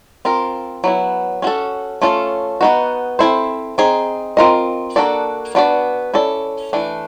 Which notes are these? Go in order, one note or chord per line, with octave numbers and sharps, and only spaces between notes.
C4 F4 A#4
F#3 B3 E4
C#4 F#4 A4
A3 C#4 F4 A4
B3 D#4 F#4
C4 E4 A4 C5
C4 D#4 G#4
C4 F4 A#4 D#5
A#3 D4 F#4 A4 D5
B3 D4 F#4 B4 D5
C#4 E4 A4 D5
E3 A3 D4